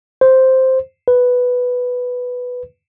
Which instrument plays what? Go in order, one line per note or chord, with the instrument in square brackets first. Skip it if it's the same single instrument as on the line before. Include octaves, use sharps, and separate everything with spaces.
[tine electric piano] C5
B4